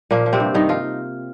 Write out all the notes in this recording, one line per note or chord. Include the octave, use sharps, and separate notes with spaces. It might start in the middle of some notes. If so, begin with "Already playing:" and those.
A#2 F3 A#3
F3
C3 C4
G2
G2 D#3 D#4
F3 F4